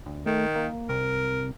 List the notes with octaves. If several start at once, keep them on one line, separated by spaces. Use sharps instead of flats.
D2
D#3 A3
A#3
C2 A#4